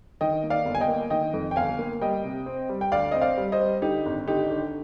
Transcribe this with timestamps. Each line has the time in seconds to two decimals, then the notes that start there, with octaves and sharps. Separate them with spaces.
0.21 D#3 D#5 G5
0.43 A#3
0.50 D5 F5
0.65 G1
0.75 G#5
0.81 D#5 G5
0.88 A#3
1.10 D#3 D#5 G5
1.33 F2
1.51 G5
1.56 G1 F5 G#5
1.79 A#3
2.01 G3 D#5 G5
2.24 C3
2.46 C4
2.69 G3
2.81 G5
2.92 D2 D5 F5
3.12 C4 D#5
3.21 D5 F5
3.38 G3
3.52 C5 D#5
3.60 G3
3.82 D3 D#4 G4
4.06 G#1
4.28 D3 D#4 G4
4.50 D3